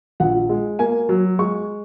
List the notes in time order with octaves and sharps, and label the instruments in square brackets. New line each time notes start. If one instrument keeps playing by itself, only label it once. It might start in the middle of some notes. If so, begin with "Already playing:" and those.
[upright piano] A#1 F#5
G#3
A#3 G#5
F#3
G#3 C#6